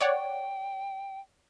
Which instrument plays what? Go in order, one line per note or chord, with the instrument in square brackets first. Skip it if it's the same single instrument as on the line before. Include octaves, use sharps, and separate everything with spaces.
[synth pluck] C#5 D5 F#5 [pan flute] G5